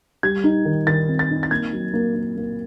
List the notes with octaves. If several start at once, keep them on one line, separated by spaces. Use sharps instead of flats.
G3 G#6
D#4
D#3
D#3 A6
C4
A6
D#4
A6
A#3 G#6
F#3
A#3
A#3
A#3